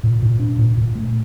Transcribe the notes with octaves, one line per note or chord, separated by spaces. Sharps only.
A#2
A#2
D4
A#2
A#2
A3